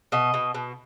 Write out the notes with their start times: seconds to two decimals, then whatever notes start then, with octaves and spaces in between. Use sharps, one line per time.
0.12 B2 D#5
0.34 B2
0.54 B2